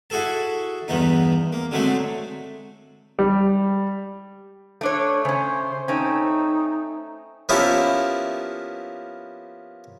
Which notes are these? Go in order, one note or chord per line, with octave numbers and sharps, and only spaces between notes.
E4 F#4 G#4 A4 A5
E2 G2 E3 B3 D#4
A#3
D3 F#3 G#3 A3 C4
G3
A3 D4 C#5
C#3 C#4 C5
A3 C4 C#4 D#4
F3 A#3 B3 C#4 E4 G4